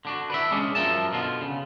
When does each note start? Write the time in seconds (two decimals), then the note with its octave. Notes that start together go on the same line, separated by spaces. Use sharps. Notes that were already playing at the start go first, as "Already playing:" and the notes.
0.05 D3 D4 F#4
0.30 B4 D5 E5
0.51 G#3 C#4 D4 G#4
0.75 F#2 F3 G4 A#4 E5 A5
1.12 B2 D3 F4
1.42 C#3